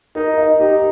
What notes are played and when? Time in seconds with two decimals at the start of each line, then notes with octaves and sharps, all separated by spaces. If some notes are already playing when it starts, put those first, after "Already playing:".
0.15 D#4 A#4
0.38 D#5
0.59 D#4 G4